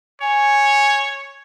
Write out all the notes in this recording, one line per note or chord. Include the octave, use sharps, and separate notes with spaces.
C#5 G#5